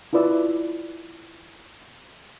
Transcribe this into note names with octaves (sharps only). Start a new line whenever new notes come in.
E4 F4 B4 D5 E6